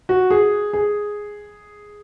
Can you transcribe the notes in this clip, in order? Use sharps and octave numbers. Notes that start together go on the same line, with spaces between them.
F#4
G#4
G#4